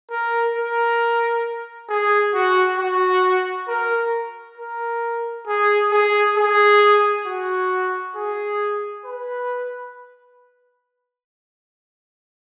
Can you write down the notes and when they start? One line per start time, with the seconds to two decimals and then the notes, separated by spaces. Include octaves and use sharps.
0.10 A#4
0.55 A#4
1.89 G#4
2.34 F#4
2.78 F#4
3.68 A#4
4.58 A#4
5.47 G#4
5.92 G#4
6.37 G#4
7.27 F#4
8.16 G#4
9.05 B4